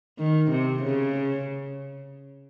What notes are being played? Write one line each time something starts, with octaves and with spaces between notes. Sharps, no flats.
D#3
C3
C#3